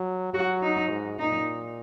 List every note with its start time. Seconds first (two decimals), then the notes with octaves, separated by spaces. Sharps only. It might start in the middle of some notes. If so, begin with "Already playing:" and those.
Already playing: F#3
0.34 F#3 F#4
0.62 D#4
0.90 G#2
1.19 A#2 D#4